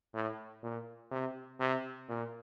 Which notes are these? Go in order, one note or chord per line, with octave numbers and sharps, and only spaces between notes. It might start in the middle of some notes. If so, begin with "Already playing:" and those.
A2
A#2
C3
C3
A#2